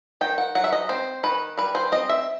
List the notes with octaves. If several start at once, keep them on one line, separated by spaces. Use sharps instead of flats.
D#3 G5
F#5
F#3 F#5
E5
D#5
C4 C5
D#3 B4
G3 B4
C5
C4 D#5
E5